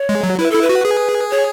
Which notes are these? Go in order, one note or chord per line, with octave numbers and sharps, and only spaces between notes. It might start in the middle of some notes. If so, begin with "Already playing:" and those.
Already playing: C#5
G#3
F#3
E4 B4
E4 A4
B4
F#4
G#4
C#5